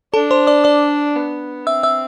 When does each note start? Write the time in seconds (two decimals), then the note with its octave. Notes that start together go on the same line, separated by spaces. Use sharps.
0.14 D4 A4 A5
0.31 C5 C6
0.47 D5 D6
0.64 D5 D6
1.16 B3
1.66 C4 E5 E6
1.83 E5 E6